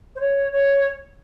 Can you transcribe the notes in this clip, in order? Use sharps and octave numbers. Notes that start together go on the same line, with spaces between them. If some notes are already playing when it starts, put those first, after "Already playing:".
C5
C#5
C#5